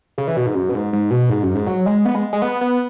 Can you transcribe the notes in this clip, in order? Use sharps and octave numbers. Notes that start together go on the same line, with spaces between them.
C#3
E3
B2
G#2
F#2
B2
G#2
G#2
B2
G#2
F#2
G#2
F#3
G#3
B3
G#3
G#3
B3
B3